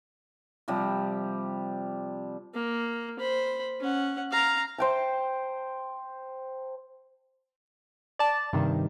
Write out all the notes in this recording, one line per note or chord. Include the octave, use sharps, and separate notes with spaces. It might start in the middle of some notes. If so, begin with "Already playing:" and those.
C3 F3 G3
A#3
C5 B5
C#4 F#5
F5 A#5
C5 G5 A5
D5 A5
G2 C3 D#3